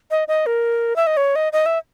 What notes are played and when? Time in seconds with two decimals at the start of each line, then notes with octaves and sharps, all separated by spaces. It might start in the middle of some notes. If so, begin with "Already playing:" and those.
0.11 D#5
0.28 D#5
0.46 A#4
0.96 E5
1.07 D#5
1.17 C#5
1.36 D#5
1.53 D#5
1.66 E5